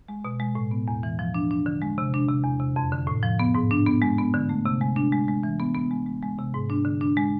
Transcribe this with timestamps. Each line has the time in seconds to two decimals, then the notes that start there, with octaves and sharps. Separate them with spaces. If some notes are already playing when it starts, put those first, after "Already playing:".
0.08 G#3
0.25 B2
0.40 G#3
0.55 A2
0.71 B3
0.88 E2
1.03 E3
1.19 F3
1.34 D4
1.51 D4
1.66 D3
1.82 G#3
1.98 C3
2.14 D4
2.28 C3
2.44 E2
2.60 C3
2.76 F2
2.92 D3
3.07 A2
3.23 F3
3.39 B3
3.55 G#2
3.71 D4
3.86 B3
4.02 G#3
4.18 B3
4.34 D3
4.49 A3
4.66 C3
4.81 G#3
4.96 D4
5.12 G#3
5.28 G#3
5.43 E3
5.60 B3
5.74 B3
5.91 G#3
6.06 G#3
6.22 G#3
6.39 C3
6.54 G#2
6.70 D4
6.85 D3
7.01 D4
7.17 G#3